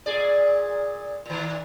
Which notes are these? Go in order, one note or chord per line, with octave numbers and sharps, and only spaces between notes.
A#2 G#4 D5
A#2 D#3